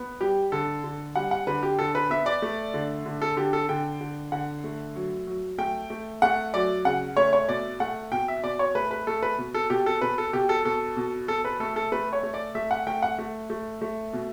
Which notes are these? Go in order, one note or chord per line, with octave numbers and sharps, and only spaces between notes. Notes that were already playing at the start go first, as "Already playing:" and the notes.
Already playing: B3
G3 G4
D3 A4
D3
G3 F#5
F#5
D3 B4
G4
D3 A4
B4
B3 E5
D5
A3
D3
D3
A4
D3 G4
A4
D3 G5
D3
D3 F#5
A3
F#3
F#3
A3 G5
A3
A3 F#5
F#3 D5
C#3 F#5
A3 C#5
C#5
B2 D5
A3 F#5
B2 G5
E5
B2 D5
C#5
A3 B4
B4
A3 A4
B4
B2
A4
B2 G4
A4
B2 B4
A4
B2 G4
A4
B2 A4
B2
B2 A4
B4
A3 A4
A4
A3 B4
C#5
A3
D5
A3 E5
F#5
A3 G5
F#5
A3
A3
A3
B2